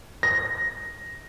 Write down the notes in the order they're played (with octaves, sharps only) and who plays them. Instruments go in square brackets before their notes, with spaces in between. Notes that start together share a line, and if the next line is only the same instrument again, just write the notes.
[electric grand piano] A#6